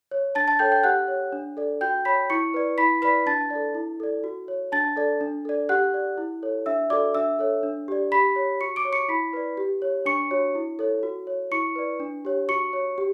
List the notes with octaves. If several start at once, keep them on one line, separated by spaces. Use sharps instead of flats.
C#5
D4 A5 A6
A5 A6
A4 C#5 G5 G6
G5 G6
G4 F#5 F#6
C#5
D4
A4 D5
F#4 G5 G6
C#5 B5 B6
E4 C#6 C#7
B4 D5
E4 B5 B6
B4 D5 B5 B6
D4 A5 A6
A4 D5
E4
A4 D5
F#4
C#5
D4 A5 A6
A4 D5
D4
A4 D5
G4 F#5 F#6
D5
E4
A4 C#5
D4 E5 E6
F#4 A4 D5 D6
D4 E5 E6
A4 C#5
D4
G4 D5
G4 B5 B6
C#5
F#4 C#6 C#7
D6 D7
C#5
C#6 C#7
E4 B5 B6
B4 D5
G4
C#5
D4 C#6 C#7
F#4 C#5
E4
A4 C#5
F#4
C#5
E4 C#6 C#7
B4 D5
D4
G4 C#5
F#4 C#6 C#7
C#5
G4